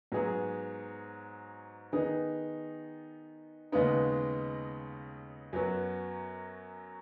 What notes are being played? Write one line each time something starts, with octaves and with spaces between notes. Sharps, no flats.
G#2 F#3 B3 G#4
D#3 B3 D#4 G#4
D#2 C#3 G#3 B3 D#4
F#2 F#3 B3 F#4